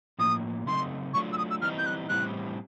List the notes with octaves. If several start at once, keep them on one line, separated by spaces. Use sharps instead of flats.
A2 F3 A#3 D#6
C#3 F#3 A3 C4 D#4 C6
F#3 A3 D4 F4 C#6
E6
D#6
E6
E3 G3 C4 D#4 F6
G6
F#6
A2 E3 G3 C4 F#6